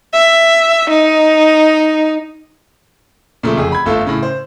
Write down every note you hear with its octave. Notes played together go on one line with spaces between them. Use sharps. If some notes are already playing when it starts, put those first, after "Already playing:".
E5
D#4
A#2 C#3 F3 A3
F1 F2 G#4
B5 G#6
G1 A3 F4 A4 E6
A2 C#3
C5